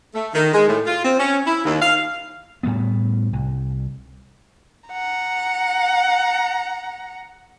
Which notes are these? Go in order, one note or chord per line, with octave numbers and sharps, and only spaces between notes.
A3
D#3
G#3
A2
F4
C4
C#4
E4
D#2
F5
A2 G3 A3 B3
C2
F#5 A#5